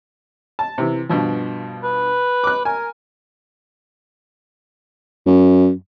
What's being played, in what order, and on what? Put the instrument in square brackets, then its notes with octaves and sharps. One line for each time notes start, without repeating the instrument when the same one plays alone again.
[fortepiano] A5
C3 E3
G2 B2 F3
[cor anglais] B4
[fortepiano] D6 F#6
[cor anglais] A#4 [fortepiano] G#5
[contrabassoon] F#2